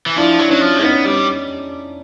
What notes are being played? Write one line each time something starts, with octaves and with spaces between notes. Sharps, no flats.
E3
F3 D4 E4
F#3
F#3 C#4 D#4
F3
B3 C#4 D#4
G3